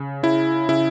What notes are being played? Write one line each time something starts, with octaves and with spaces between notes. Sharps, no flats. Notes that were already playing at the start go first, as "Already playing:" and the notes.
Already playing: C#3
C#3 E4
C#3 E4